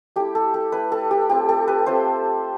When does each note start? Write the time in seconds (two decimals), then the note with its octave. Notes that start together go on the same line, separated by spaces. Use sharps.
0.16 A3 E4 G4
0.35 A4
0.54 A4
0.72 A3 E4 B4
0.92 A4
1.11 G4
1.29 A3 C4 F4 G4
1.49 A4
1.68 B4
1.86 A3 C4 F4 C5